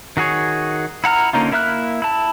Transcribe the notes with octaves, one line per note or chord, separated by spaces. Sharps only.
D#3 F#4 G#4 C#5
E4 F#5 A#5 F6
D3 A#3 C#4 D#4 F4
A#3 E4 E5 F6 F#6
E4 A5